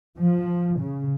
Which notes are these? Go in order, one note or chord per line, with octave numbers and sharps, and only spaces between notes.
F3
C#3